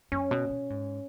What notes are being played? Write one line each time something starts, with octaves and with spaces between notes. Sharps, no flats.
F#2 C#4
B2
B2
G#2